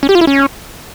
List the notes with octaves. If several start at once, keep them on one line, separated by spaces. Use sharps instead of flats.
C#4
G4
F4
E4
C#4